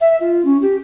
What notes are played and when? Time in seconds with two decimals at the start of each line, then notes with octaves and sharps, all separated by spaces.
0.01 E5
0.20 F4
0.45 C#4
0.62 G4